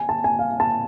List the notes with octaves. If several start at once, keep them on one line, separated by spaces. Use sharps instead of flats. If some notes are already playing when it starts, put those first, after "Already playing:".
Already playing: G#5
A5
G#5
F5
A5